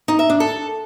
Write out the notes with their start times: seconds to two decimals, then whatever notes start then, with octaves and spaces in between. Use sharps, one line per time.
0.08 D#4
0.19 E5
0.30 D4
0.40 A4